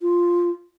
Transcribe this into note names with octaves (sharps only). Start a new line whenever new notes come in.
F4